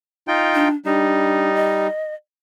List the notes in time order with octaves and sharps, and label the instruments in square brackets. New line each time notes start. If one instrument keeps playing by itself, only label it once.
[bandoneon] D#4 F4 G5
[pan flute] D4
[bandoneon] G3 D#4 [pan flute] D4
[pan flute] D#5